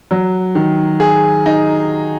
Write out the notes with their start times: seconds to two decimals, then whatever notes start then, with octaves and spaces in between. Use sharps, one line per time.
0.11 F#3
0.55 D#3
1.00 G#4
1.46 D#4